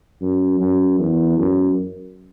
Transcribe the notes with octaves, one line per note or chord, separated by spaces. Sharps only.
F#2
F#2
E2
F#2